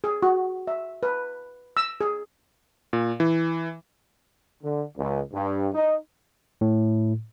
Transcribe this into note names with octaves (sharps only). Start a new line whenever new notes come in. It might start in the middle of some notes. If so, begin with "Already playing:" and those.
G#4
F#4
E5
B4
E6
G#4
A#2
E3
D3
C#2
G2
D#4
A2